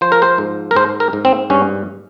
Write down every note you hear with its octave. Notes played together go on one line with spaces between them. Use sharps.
F3 C5
A#4
C5
G#2
A#4
G#2 C5
A#4
G#2
C4
G2 C#4